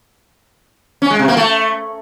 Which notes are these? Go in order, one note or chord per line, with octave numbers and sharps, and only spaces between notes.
C#4
G#3
C3
A#3
A3